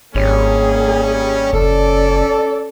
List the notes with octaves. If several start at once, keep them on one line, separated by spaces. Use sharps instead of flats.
G#1 G3 A#3 C#4 G#4
F#1 C#4 A4 D5